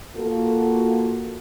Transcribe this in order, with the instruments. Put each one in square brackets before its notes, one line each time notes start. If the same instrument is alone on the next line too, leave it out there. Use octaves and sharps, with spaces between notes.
[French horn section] A#3 F4 F#4 A4